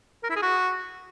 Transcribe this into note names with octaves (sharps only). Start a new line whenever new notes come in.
A#4
E4
G#4
F#4